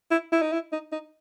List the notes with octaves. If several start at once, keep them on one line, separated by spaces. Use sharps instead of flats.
E4
E4
D#4
E4
D#4
D#4